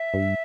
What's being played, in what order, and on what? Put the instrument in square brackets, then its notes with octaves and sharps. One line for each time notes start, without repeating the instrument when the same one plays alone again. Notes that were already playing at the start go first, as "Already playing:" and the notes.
Already playing: [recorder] E5
[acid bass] G2